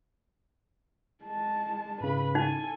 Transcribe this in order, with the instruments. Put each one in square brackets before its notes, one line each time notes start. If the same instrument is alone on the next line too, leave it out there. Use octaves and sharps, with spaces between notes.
[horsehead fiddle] G#3 A5
[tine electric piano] G#2 C#3 [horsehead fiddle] B4 B5
[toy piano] D#4 [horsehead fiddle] A4 G#5